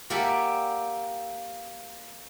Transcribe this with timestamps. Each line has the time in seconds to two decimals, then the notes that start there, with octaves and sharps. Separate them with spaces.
0.10 A#3 G4 D5 E5 F#5 A5